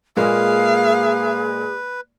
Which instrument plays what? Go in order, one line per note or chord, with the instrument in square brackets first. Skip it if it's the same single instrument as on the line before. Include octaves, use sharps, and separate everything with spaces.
[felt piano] A#2 G#3 A#3 [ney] G#4 [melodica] B4 [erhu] F5